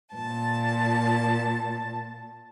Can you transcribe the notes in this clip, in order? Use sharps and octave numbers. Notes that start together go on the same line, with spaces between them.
A#2 A5